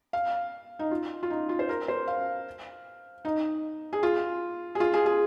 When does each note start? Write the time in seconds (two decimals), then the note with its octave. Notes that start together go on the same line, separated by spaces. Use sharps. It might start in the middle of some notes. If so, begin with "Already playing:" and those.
0.13 F5
0.79 D#4
0.91 F4
1.23 F4
1.30 D#4
1.49 F4
1.59 C5
1.69 A#4
1.88 C5
2.08 F5
3.25 D#4
3.93 G#4
4.03 F4
4.75 G#4
4.80 F4
4.94 G#4
5.06 G#4